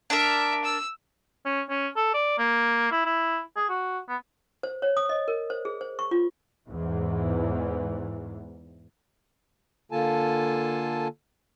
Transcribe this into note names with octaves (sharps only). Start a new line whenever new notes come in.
D4 A#4 E5
E6
C#4
C#4
A4
D5
A#3
E4
E4
G#4
F#4
B3
C5
C#5
D#6
D#5
A#4
C5
G#4
C5
C#6
F4
E2 G#2 E3
D3 A#3 F4 A4 G#5 A5